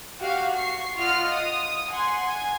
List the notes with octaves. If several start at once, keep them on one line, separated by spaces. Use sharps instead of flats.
F#4 G4 F5
C#6 C7
F4 D#5 F#5 F6
D#6
F#5 G#5 C6
G#5